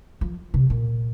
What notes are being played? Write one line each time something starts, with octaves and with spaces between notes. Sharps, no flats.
F3
C3
A#2